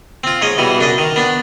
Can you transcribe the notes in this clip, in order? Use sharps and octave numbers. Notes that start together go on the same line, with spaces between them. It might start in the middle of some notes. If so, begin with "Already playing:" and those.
C4 F4
G#2 C#5 D#5
B2 E3 G3
F#2 D4 D#5
D#3
B3 D4